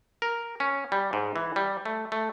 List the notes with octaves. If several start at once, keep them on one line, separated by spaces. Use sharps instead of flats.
A#4
C#4
G3
G#2
E3
G3
A3
A3